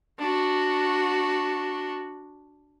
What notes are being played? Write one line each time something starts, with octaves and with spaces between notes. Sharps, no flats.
D4 F#4